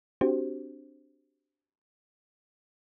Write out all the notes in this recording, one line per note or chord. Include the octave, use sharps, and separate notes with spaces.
C4 D4 F#4 G4 C5